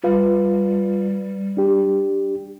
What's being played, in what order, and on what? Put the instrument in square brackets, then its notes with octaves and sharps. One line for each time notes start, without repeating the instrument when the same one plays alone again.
[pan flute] G3 [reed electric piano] F4 B4 F5
[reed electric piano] D4 G4